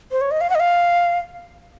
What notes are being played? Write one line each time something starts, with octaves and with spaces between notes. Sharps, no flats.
C5
C#5
D#5
F5
F#5
D#5
F5